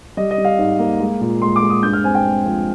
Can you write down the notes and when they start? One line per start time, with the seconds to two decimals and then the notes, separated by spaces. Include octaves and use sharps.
0.17 G3 D#5
0.31 D#5
0.38 G3
0.45 F5
0.59 G#2
0.79 A#3
1.00 G#3
1.21 A#2
1.42 G#3 C6
1.56 D6
1.63 G#3
1.70 D#6
1.83 G2 G6
1.93 F6
2.04 C4 G#5
2.15 G5
2.25 G#3
2.45 F3